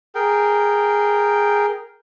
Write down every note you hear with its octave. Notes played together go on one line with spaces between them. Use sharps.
G#4 A#4 G5